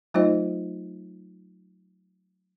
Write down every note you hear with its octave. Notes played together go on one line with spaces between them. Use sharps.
F#3 A3 D#4 F4 C5 D#5